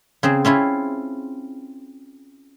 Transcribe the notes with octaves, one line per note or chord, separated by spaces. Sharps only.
C#3 C4 G#4
C4 C#4 E4 F4